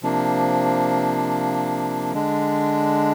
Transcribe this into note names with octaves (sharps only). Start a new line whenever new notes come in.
C3 F3 A#3 D4
D3 G#3 D4